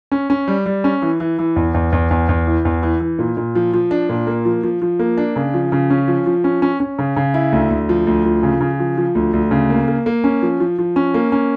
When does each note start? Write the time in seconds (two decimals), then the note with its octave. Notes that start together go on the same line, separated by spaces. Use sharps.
0.12 C#4
0.30 C#4
0.48 G3
0.66 G3
0.84 C#4
1.02 E3
1.20 E3
1.39 E3
1.56 E2
1.74 E2
1.92 E2
2.11 E2
2.29 E2
2.47 E3
2.65 E2
2.83 E3
3.00 E3
3.19 A#2
3.37 A#2
3.55 F3
3.73 F3
3.91 D4
4.09 A#2
4.27 A#3
4.45 F3
4.63 F3
4.82 F3
4.99 A#3
5.18 D4
5.36 C#3
5.54 F3
5.72 C#3
5.90 C#4
6.08 F3
6.26 F3
6.44 C#4
6.62 C#4
6.80 C#4
6.99 C#3
7.16 C#3
7.34 E4
7.52 D2
7.70 D2
7.89 F3
8.07 D2
8.25 F3
8.43 C#3
8.61 C#3
8.80 F3
8.97 F3
9.15 D2
9.33 D2
9.51 C#3
9.70 A#3
9.88 A#3
10.06 A#3
10.24 C#4
10.42 F3
10.60 F3
10.79 F3
10.96 C#4
11.14 A#3
11.32 C#4